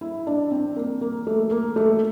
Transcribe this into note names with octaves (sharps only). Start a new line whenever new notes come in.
E4
D4
C4
A#3
A#3
A3
A#3
A3